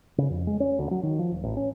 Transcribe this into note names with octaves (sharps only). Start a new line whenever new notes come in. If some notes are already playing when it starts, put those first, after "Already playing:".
C#3
F2
G#3
C#4
D2
F#3
D#3
F3
D#1
A1
C#4